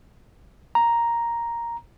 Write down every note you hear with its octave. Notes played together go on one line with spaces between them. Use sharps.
A#5